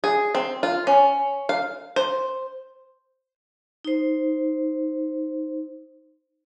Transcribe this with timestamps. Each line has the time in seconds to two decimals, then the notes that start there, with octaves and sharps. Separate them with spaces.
0.04 G#4
0.35 C4
0.63 F4
0.87 C#4
1.49 F5
1.96 C5
3.85 D#4 C5